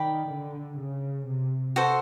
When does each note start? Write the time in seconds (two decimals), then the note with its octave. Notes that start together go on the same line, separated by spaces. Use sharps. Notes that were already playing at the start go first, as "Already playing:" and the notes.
Already playing: D#3 D5 G5 B5
0.31 D3
0.79 C#3
1.28 C3
1.76 F#4 A4 C5